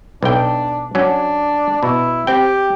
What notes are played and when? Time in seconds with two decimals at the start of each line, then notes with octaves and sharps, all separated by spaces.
0.23 B1 D4 G5
0.95 F#3 C#4 D4
1.83 B2 E4
2.27 C4 G4 G5